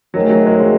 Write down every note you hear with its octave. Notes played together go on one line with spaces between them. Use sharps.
G#2 D#3 F#3 A3 C#4
F#3
G#3
F#3